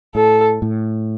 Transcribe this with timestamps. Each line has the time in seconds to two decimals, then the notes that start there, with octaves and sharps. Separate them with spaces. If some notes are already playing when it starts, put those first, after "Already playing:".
0.15 A2 A4
0.62 A2